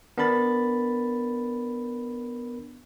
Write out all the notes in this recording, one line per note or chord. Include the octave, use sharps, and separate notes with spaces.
B3 D4 A#4 B5 A6